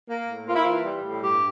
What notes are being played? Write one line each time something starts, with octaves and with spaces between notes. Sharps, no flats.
A#3
A2
A#3 F4
E4
E3 F4
G3
A2
G2 G4